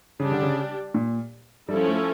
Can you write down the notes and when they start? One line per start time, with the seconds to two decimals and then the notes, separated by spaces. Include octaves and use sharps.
0.20 C#3 G3 D4 G4
0.31 D3
0.42 C#3
0.94 A#2
1.69 F3 G3 C#4 E4 A4
1.87 A3